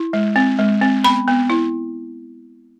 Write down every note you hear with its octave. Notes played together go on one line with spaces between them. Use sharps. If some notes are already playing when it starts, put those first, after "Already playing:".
Already playing: E4
G#3
C4
G#3
C4
B3 B5
B3
E4